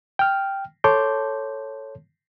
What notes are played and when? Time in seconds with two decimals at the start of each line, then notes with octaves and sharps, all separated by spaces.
0.19 G5 F6
0.84 A4 C#5 A5 C6 D6 G6